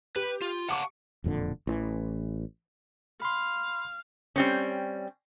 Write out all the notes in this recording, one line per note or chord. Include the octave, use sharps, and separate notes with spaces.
G4 B4
F4
F5 F#5 A5 C#6 D6 C#7
E1 F2 A#2 D3
A1 E3
F5 B5 C6
G3 C4 C#4